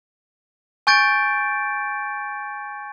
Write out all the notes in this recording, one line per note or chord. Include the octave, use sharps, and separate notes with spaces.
G#5 C#6 G6 A6 D7